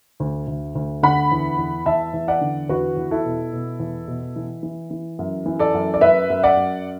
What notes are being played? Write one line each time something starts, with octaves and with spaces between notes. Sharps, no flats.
D2
D2
D2
D3 F#5 B5
E2
E2
E2 E5 A5
E2
D5 F#5
D3
E2 F#4 B4
E2
E4 A4
B2
B2
E2
B2
E3
E3
E3
F#2
E3
A4 D5
F#2
D5
F#2 B4 E5
F#2
D5 F#5
F#2